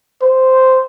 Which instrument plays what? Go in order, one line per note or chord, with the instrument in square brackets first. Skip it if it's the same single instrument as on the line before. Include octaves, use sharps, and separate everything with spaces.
[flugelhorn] C5